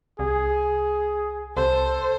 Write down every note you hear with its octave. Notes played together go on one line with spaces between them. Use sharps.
C2 G#4
C2 A4 C5